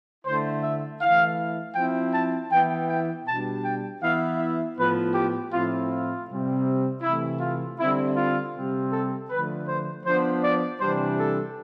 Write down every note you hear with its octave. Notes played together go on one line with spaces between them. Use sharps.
D3 A3 E4 C5
E5
E3 A3 E4 F5
F3 C4 E4 G5
A5
E3 B3 E4 G5
G5
B2 G3 D4 A5
G5
E3 B3 E4 F5
E5
A2 F3 B3 B4
G4
A2 F3 C4 E4 F4
F4
C3 G3 C4
C3 E3 A3 E4
F4
D3 G3 C4 E4
F4
C3 G3 C4
A4
D3 F3 A3 B4
C5
F3 B3 D4 C5
D5
C3 E3 G3 D4 C5
A4